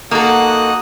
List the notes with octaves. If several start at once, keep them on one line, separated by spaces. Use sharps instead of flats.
A#3 D#4 F#4 A4 F#5 D#6